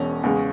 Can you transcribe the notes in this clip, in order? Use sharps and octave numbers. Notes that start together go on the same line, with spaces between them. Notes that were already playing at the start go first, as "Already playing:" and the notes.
Already playing: E1 E2 B2 C#4
E2 C#3 G#3